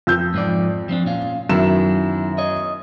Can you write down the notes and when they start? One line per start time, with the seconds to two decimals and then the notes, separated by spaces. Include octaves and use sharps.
0.07 F2 E6 G6
0.34 G#2 F3 D5
0.89 F3 C4 D4
1.05 A#2 C#4 F4
1.49 F#2 D#3 B3 E4 E7
2.38 C#5 D#5